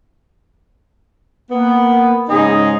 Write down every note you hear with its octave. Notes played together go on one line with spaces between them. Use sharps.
A#3 B3
G#2 C#3 D#4 G#4 D#5